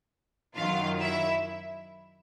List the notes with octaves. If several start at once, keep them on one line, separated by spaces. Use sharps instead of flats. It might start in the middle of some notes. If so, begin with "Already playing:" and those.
F#2 D#3 F#3 F4 F5
E4 E5